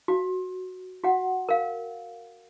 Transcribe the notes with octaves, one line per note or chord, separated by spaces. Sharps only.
F#4
F#4 F#5
A#4 F5